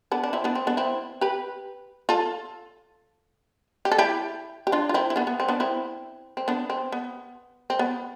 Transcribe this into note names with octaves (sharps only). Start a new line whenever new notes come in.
B3 D4
D4
C4 E4
B3 D4
C4
B3 D4
C4 E4
G4 B4
F4 A4
G4
A4
E4 G4
G4
D4 F4
F4
C4 E4
E4
B3 D4
B3
C4
B3 D4
C4 E4
C4
B3 D4
C4
B3
C4
B3